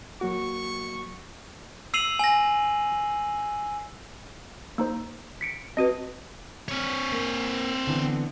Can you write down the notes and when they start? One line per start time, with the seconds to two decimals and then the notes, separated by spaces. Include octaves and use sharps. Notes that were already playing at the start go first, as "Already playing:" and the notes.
0.21 F#3 A#3 F#4 C#6
1.94 E6 C7 D#7 F7 F#7
2.19 G#5 A#6
4.78 A#3 D#4 C5
5.41 B6 C#7 D7
5.77 C4 F#4 B4 D#5
6.68 C4 C#5
7.12 A#3
7.87 D3 E3 B3